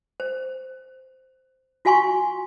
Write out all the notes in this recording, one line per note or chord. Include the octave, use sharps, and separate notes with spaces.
C5
F4 F#4 F5 G#5 C6 C#6